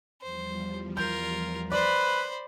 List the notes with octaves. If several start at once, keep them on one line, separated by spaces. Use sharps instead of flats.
E2 F3 G3 C5
F4 A#4 G6
B4 C5 D5 B5